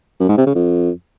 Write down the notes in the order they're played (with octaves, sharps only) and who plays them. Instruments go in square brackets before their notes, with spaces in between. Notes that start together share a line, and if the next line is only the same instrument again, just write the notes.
[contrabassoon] F#2
G#2
C3
C#3
F2